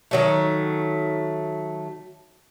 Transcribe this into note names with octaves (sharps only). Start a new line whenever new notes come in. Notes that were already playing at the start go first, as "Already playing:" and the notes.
D#3 F#3 A3